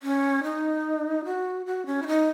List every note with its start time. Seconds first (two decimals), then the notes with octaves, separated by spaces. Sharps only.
0.03 C#4
0.43 D#4
1.25 F#4
1.66 F#4
1.86 C#4
2.02 E4
2.07 D#4